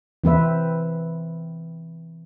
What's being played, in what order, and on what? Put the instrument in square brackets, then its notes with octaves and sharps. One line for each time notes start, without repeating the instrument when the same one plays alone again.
[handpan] E3 C4 B4 E5